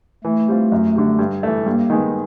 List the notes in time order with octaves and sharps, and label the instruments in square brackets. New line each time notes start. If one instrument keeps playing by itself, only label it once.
[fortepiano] E3 [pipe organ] A3
[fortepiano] G3 C4 F4
F#2
D3 G3
G2
E3 A3
[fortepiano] G2 [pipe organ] A#3
[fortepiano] D#3 G#3 B3